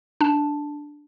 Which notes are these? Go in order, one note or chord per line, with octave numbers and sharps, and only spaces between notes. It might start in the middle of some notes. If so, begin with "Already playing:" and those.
D4 A5